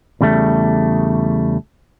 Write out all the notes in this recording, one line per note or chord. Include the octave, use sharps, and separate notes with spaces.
E2 C#3 G3 A3